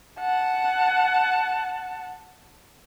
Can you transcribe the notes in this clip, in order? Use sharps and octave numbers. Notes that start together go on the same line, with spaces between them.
F#5 A5